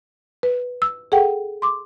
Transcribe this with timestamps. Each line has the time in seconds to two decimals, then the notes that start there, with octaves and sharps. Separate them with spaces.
0.43 B4
0.82 E6
1.12 G#4 A4 F#5 G5
1.62 C6 D6